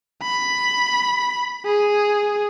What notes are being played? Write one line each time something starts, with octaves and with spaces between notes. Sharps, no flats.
B5
G#4